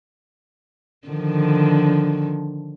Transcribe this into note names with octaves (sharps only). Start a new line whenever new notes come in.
D3 D#3 F3